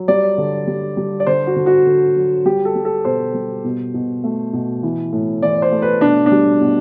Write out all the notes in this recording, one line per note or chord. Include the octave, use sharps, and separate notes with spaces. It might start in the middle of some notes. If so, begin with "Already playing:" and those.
Already playing: F#3
G3 D5
D3
G3
G3
D5
D3 C5
F#4
D3
F#4
D3
F#3
G3 G4
A4
G3
A4
B2 C5
G3
B2
B2
A3
B2
E3
A2
E3 D5
C5
A3
B4
B2 D4
D4
G3
B2